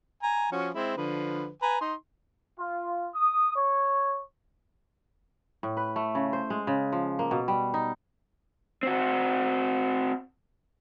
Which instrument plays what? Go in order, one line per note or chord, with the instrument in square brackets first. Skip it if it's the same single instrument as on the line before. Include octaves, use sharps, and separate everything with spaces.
[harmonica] G#5 A#5
F3 C#4 F#4
G#3 C4 E4
D3 F3 B4
B4 G#5 A#5
D#4 C6
[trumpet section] F4
D#6
C#5
[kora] A2
B4
A3
C#3
C5
G#3
C#3
F3
A#3
B2
G3
D#4
[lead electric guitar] C4 F#4